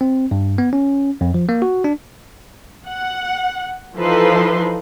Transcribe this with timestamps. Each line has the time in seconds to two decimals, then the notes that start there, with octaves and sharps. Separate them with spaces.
0.01 C4
0.31 G2
0.58 B3
0.73 C#4
1.21 F2
1.34 F3
1.49 A#3
1.62 F#4
1.84 D4
2.87 F#5
3.96 E3 F3 D#4 A4 B4 C6